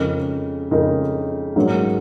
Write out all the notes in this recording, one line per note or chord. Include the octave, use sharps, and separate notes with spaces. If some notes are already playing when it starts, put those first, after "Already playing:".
Already playing: F2 C#3 G#3 D#4 A#4
F2 C#3 G#3 D#4 A#4
A#1 G#2 F#3 A#3 C#4